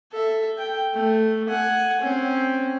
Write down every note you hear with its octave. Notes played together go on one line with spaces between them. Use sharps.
A4 E5
G5
A3
F#5 G#5
C4 C#4